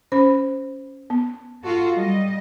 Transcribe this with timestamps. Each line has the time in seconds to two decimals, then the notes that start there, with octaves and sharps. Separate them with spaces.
0.12 C#4 C5 B5
1.10 B3
1.63 F4 F#4 A4
1.95 G3 D#5